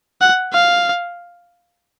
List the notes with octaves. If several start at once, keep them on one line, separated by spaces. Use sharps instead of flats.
F#5
F5